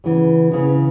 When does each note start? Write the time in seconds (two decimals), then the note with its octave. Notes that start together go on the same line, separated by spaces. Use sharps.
0.04 C#3 E3 B3
0.51 C#3 E3 B3